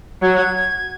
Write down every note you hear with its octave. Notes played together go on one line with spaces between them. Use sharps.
F#3 G#6